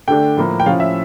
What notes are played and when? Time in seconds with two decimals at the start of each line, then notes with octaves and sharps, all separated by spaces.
0.08 D3 A3 D4 G5
0.37 A2 F3 A#3
0.60 G5
0.66 A2 F3 C#4 F5
0.80 E5